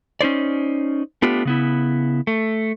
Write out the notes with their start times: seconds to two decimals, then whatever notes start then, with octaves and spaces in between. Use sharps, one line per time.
0.21 C#4 D#4 C5 D5
1.22 A3 B3 D4 F4 G4
1.45 C#3 B3 E4
2.27 A3